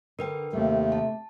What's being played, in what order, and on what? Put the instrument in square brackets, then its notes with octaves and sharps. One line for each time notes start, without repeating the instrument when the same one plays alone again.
[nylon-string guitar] D3 [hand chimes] A#4 B4 G5
[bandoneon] D#2 [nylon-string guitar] C3 A3
[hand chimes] A5